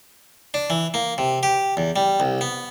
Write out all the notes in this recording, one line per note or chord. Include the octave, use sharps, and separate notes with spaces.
D4
E3
A#3
C3
G4
E2
G3
C2
B3